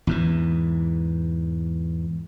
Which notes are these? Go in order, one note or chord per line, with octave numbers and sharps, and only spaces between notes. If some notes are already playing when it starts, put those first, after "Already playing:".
E2 G#2 E3